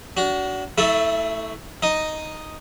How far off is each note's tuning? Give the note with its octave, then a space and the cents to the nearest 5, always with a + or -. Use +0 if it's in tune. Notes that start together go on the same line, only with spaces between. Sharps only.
D4 -30 F#4 +20
A3 +15 E4 -25 A4 +0
D#4 +0 D#5 +0